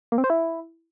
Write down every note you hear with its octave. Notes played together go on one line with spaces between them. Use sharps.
A#3
C4
C5
E4